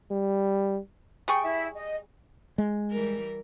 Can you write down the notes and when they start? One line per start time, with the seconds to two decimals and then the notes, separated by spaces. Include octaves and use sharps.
0.11 G3
1.28 G3 G#4 G5 C#6
1.42 E4 E5
1.74 D#5
2.58 G#3
2.91 E3 G3 A#4